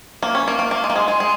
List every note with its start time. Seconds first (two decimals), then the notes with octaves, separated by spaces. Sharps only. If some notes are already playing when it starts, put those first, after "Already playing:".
0.23 A#3
0.35 C#4
0.48 A#3
0.59 A#3
0.71 A#3
0.84 G#3
0.90 A#3
0.96 G#3
1.08 G#3
1.20 G#3